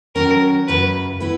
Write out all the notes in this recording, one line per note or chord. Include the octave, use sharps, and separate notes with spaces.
D#3 F#3 C#4 A#4
F#2 C#3 F#3 B4
B3 E4 B4